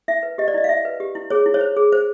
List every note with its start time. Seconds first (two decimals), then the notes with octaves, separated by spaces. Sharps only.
0.08 E4 E5
0.23 B4
0.38 G4 D#5
0.48 D5
0.54 E4 D#5
0.64 F5
0.69 E4 E5
0.85 B4
1.00 G4
1.15 E4
1.30 G#4 C#5
1.46 E4
1.54 C#5
1.61 C5
1.77 G#4
1.92 C5